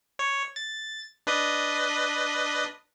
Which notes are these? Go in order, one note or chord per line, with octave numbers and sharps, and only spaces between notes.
C#5
A6
D4 B4 D#5